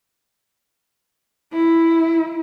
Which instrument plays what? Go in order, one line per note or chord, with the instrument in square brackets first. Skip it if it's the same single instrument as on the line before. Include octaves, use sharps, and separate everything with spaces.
[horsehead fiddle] E4